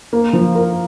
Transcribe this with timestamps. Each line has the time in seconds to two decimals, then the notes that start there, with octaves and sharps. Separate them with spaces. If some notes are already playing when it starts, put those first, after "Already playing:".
0.13 A#3
0.33 F3
0.55 A#4